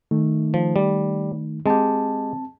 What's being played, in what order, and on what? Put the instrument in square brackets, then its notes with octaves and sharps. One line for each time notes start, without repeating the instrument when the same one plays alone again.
[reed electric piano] D#3 A3 D#4
[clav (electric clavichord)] F3
G3
[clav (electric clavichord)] G#3 G4 [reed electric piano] C4 A5